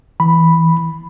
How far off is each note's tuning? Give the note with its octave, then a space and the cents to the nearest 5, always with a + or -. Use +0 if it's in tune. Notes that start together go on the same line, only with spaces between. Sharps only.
E3 -5 B5 +0